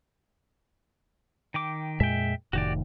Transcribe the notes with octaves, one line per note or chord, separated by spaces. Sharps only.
D#3 G5 D6
F2 A#2 G#3 E5 G5
F1 A2 D#3 F#4 G4 D5